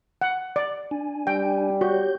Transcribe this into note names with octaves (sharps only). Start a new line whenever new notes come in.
F#5
D5
D4 G#5
G3 G5
F#4 G4 C#5 G6